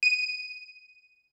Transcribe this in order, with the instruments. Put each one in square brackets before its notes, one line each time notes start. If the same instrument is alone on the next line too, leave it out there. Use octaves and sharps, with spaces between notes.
[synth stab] D#7